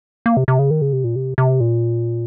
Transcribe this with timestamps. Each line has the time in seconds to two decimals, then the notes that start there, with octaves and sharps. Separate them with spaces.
0.26 A#3
0.37 C3
0.48 C3
0.59 C#3
0.70 D#3
0.82 C#3
0.93 C3
1.04 A#2
1.16 C3
1.38 C3
1.60 A#2